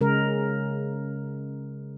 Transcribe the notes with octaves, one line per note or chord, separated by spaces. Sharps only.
C#3 G#3 A#4